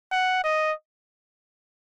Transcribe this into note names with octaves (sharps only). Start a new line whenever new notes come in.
F#5
D#5